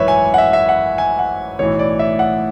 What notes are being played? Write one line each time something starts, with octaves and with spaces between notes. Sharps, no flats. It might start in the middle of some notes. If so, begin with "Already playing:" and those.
Already playing: G#1 F#2 E3 B4 C#5 E5
G#5
F#5
E5
E5
F#5
G#5
F#5
B1 A2 E3 C#5
D5
E5
F#5